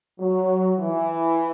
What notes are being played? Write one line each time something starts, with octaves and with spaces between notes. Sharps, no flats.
F#3
E3